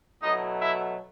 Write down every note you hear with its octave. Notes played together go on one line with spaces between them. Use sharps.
B2 F#3 A3 D#4 E4 D#5
E4 E5